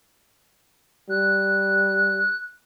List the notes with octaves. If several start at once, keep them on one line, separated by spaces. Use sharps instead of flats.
G3 F#6